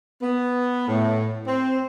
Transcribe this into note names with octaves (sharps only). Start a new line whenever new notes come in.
B3
A2
C4